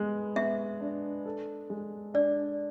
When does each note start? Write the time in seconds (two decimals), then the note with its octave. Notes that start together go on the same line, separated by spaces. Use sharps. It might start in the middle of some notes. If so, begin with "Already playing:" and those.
Already playing: G#3 B3
0.36 B3 E5
0.81 D4
1.25 A4
1.70 G#3
2.14 D4 D5